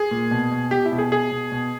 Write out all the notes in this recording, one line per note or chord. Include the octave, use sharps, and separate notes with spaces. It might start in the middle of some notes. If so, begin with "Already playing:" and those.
Already playing: G#4
A#2
B2
B2
B2 G4
E4
B2
G#4
B2 G#4
B2
B2